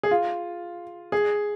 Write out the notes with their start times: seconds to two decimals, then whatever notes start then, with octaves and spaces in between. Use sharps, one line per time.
0.03 G#4
0.11 F4
1.12 G#4